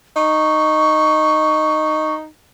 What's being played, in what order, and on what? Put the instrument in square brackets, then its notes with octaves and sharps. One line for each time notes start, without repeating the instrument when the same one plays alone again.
[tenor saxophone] D#4 [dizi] C#6